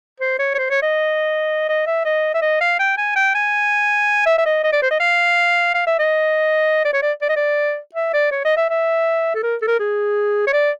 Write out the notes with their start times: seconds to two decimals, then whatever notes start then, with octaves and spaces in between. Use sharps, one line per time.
0.20 C5
0.39 C#5
0.54 C#5
0.58 C5
0.70 C#5
0.82 D#5
1.69 D#5
1.86 E5
2.05 D#5
2.34 E5
2.42 D#5
2.61 F5
2.79 G5
2.98 G#5
3.16 G5
3.35 G#5
4.26 E5
4.38 E5
4.45 D#5
4.64 D#5
4.73 D5
4.82 C5
4.91 D#5
5.00 F5
5.75 F5
5.87 E5
5.99 D#5
6.85 D5
6.93 C#5
7.02 D5
7.22 D5
7.29 D#5
7.36 D5
7.95 E5
8.14 D5
8.32 C#5
8.45 D#5
8.57 E5
8.70 E5
9.35 A4
9.43 A#4
9.62 A4
9.68 A#4
9.80 G#4
10.47 C#5
10.53 D5